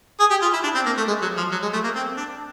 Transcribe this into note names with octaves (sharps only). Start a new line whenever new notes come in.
G#4
G4
F4
E4
D4
C4
A#3
A3
G#3
F#3
F3
F#3
G#3
A3
A#3
C4
D4